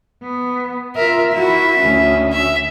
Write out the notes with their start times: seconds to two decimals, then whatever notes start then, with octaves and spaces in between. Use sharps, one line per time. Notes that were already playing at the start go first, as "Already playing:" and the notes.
0.22 B3
0.96 F4 A#4 E5
1.34 E4 F#4 E5
1.80 D2 C#4
2.32 E5